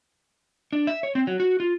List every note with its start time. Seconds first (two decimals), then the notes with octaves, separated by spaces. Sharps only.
0.73 D4
0.87 E5
1.03 C#5
1.15 C4
1.27 F#3
1.40 F#4
1.60 F4